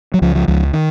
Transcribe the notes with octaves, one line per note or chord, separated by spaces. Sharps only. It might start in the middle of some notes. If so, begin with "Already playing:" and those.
F#3
C#2 F3
F3
C#2 F3
D#3